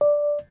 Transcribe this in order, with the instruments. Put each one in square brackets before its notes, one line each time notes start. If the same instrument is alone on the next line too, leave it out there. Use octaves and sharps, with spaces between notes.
[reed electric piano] D5